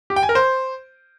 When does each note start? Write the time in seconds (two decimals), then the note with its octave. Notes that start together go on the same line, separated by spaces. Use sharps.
0.10 G4
0.16 G5
0.23 G#5
0.29 A#4
0.35 C5